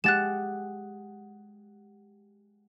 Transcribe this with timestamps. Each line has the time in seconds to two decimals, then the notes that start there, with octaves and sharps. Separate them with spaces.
0.04 G#3 G4 F#5 F#6 A6 E7